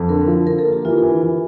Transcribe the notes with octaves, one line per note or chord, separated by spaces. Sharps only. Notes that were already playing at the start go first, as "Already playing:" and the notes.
Already playing: F2
D3 A#4
F3
D3 A#4
A4
A#3
G4
E3 F4
E3
E3